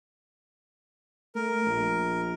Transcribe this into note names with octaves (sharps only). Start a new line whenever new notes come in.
A3 A#4
A#1